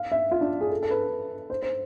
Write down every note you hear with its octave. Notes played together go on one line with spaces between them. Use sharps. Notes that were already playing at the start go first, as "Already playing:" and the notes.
Already playing: F5
E5
F4
D4
G#4
A4
A4
B4
C5
C5